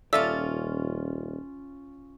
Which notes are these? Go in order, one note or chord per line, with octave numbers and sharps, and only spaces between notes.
D#1 C#4 F4 A4 D5 E5 A5 E6